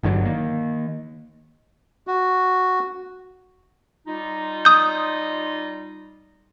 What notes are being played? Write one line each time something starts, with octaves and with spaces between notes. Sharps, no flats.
G1 G2 D3 F#3
D#3 A#3
F#4
G3 D#4 F4
D#6 G6